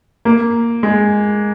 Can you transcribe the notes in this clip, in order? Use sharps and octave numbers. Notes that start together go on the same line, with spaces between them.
A#3
G#3